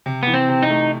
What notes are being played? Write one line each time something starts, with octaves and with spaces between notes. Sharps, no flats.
C3
E3 B3
C4
C3
D#4
A3